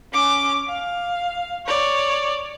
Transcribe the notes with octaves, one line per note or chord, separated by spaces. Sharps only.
C#4 D6
F5
C#5 D5